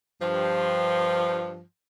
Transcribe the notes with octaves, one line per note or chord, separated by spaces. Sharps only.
G2 F3